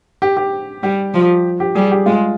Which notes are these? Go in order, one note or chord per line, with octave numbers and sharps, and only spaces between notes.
G4
G4
G3 G4
F3
G4
G3 G#4
G4
G#3 F4